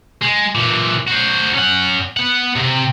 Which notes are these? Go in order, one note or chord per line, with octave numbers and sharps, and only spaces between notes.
G#3
A#2 E3
F#4 C5
C#4 F#5
B3 F#5
C3